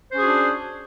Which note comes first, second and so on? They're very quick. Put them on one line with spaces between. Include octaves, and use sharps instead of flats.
C5 C#4 G#4 F#4 D4